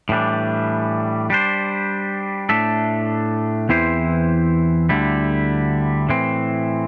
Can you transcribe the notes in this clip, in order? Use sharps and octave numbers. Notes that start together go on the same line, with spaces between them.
A2 E3 G3 D4
G3 D4 C5
A2 A3 D4 A4 E5
E2 E3 C4 E4 C5
D2 D3 G3 E4
A2 E3 C4